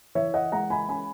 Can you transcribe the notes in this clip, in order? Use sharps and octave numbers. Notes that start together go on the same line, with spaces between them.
E3 C#5 E5
D#5 F#5
G#3 F#5 A#5
G#5 B5
C#4 G#5 B5